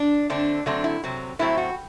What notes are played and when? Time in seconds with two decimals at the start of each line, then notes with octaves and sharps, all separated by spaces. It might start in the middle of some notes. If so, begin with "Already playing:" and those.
Already playing: D4
0.30 D3 A3 C4 D4
0.66 D3 F#3 A3 C4 D4
0.84 E4
1.03 C3 F#3 C4
1.39 A2 F#3 A3 C4 E4
1.58 F#4